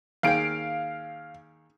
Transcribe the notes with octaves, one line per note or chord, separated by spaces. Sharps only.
D#2 G#4 F5 G5 D7